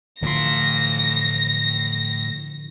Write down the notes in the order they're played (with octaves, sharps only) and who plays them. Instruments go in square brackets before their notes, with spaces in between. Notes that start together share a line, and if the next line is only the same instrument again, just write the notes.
[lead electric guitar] A2 C6 [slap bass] D3 E3 F3 [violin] A#6